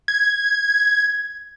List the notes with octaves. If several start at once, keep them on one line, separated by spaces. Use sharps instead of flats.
G#6